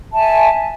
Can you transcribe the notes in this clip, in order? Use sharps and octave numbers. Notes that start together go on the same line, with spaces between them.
E5 G#5 A5